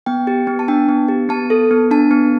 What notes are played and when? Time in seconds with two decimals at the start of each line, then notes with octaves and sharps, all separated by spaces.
0.06 B3 G5
0.27 G4
0.47 B3
0.59 A5
0.68 D4 G5
0.89 B3
1.08 G4
1.29 B3 A5
1.50 A4
1.71 B3
1.91 D4 A5
2.11 B3